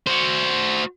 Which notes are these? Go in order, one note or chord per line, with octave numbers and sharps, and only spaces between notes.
F#4 C5